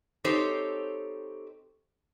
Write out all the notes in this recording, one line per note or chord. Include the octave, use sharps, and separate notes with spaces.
C4 D#4 G4 A4 C5 C#5